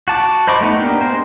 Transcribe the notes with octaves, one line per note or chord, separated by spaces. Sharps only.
F#4 A5 D6
C5 D#5 B5 C#6 D6
A3 B3 D#4
A#3 B3 D4 G4 A#4
G#3 A#4 C5